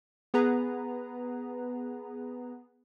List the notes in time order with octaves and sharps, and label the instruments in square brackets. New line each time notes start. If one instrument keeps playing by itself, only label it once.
[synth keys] B3 G#4 B4 A#5